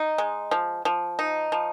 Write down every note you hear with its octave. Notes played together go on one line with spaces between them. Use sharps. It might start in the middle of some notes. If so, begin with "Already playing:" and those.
Already playing: D#4
G#3
F3
F3
D#4
F3